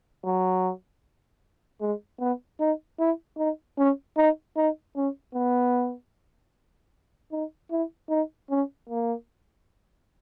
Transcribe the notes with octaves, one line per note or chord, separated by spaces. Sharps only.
F#3
G#3
B3
D#4
E4
D#4
C#4
D#4
D#4
C#4
B3
D#4
E4
D#4
C#4
A#3